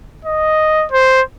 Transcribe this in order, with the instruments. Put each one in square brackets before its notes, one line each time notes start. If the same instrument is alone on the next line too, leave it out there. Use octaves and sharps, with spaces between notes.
[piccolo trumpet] D#5
C5